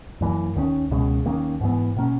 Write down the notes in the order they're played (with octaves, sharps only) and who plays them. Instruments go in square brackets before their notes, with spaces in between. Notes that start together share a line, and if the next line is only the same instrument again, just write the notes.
[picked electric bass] F#2 E3 A#3
D#2 D#3 A#3 C#4
C#2 B2 G#3 C#4
D#2 D#3 A#3 C#4
G#2 E3 B3
B2 A#3 C#4